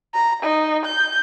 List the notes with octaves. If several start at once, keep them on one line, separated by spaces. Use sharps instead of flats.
A#5
D#4
G6